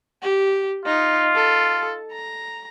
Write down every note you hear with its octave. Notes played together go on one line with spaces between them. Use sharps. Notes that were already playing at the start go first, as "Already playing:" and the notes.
G4
D#4 F4
A4
A#5